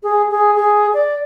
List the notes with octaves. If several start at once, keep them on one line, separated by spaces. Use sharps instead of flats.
G#4
G#4
G#4
D5